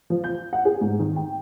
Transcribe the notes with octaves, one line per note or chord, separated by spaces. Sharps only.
F3
G6
F#5
G#4
G#2
D#3
G5